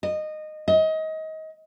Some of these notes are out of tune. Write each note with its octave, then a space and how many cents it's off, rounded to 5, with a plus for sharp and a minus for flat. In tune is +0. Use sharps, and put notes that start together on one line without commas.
D#5 -15
D#5 +25